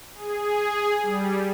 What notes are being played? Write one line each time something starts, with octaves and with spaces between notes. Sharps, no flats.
G#4
G3